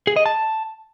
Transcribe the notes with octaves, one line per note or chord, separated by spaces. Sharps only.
G#4
D#5
A5